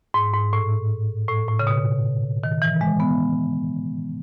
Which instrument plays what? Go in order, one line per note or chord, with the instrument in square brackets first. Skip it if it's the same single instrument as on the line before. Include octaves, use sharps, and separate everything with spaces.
[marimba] G#2
G#2
A2
A2
A2
C#3
B2
D#3
E3
G#3
B3